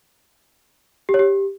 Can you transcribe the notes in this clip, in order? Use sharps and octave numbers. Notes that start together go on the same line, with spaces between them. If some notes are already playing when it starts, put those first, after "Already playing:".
G4
C#5
G4